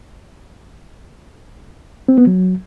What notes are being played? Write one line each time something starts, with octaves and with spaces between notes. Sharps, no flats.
C4
B3
F#3